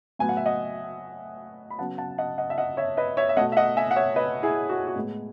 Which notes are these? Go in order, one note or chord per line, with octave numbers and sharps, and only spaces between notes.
A2 F#3 B3 G#5
F#5
E5
D#5 F#5
B5
C#3 F#3 B3 F#5 A5
F#5 A5
D#5 F#5
D#5 F#5
E5
D#5 F#5
C#5 E5
B4 D#5
C#5 E5
E5
B2 A3 D#5 F#5
E5
D#5 F#5
E5 G#5
F#5
C#5 E5
B4 D#5
E4 G#4
F#4
G#4
F#4
A2 G#3 B3